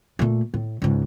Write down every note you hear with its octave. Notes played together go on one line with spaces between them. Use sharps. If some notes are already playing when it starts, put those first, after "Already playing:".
A#2 A3
A2
C#2 G#2